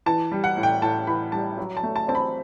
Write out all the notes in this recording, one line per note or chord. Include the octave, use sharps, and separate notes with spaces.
E3 A5
G3
F#5
A2
G5
A2 A5
E3 B5
G3 A5
F#3
A5
A3
A5
C4 A5
B5